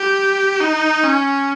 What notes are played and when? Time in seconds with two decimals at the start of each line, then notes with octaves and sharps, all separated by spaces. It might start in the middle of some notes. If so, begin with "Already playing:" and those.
Already playing: G4
0.60 D#4
1.04 C#4